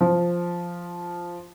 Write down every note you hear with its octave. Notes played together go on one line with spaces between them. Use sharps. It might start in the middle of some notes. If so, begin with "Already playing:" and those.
F3